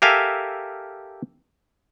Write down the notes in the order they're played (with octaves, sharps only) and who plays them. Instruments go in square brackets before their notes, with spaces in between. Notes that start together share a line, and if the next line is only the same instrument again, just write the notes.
[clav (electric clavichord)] G4 A4 A#4 E5 F5 G#5